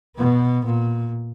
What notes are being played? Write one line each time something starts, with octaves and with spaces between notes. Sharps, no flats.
B2 B3
A#2